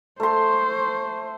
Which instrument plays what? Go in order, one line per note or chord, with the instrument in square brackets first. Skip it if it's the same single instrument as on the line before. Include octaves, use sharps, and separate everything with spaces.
[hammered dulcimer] A3 C6 [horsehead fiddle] C5